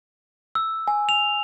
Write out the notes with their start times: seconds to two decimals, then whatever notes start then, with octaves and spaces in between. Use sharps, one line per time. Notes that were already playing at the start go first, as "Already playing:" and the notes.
0.55 E6
0.88 G#5
1.09 F7